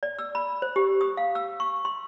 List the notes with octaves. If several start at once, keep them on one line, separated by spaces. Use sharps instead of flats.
D5
E6
B5
C5
G4
D#6
F5
E6
C#6
C6